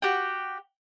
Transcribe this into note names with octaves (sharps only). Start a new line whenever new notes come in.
F#4 G4 F#5 G5